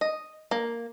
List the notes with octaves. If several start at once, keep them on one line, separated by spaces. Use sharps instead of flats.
D#5
A#3